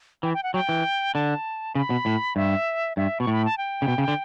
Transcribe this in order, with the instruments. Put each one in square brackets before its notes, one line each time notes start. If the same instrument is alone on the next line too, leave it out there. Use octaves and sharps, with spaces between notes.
[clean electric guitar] E3 [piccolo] G5
[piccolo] G5
F#5
[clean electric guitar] F#3 [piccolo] G5
[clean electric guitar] E3
[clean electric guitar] D3 [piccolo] A5
[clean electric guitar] C#3 [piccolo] B5
[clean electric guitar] B2
A2
[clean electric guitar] G2 [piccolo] E5
[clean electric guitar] G2 [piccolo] E5
[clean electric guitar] B2 [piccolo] C#6
[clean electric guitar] A2
[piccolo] B5
A5
G5
[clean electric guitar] C#3
B2
C#3
D3